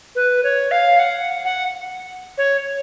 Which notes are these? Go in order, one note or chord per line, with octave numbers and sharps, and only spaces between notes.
B4
C#5
F5
F#5
F#5
C#5